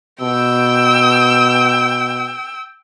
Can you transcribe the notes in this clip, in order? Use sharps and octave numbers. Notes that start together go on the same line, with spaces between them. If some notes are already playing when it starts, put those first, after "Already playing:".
B2 G5 E6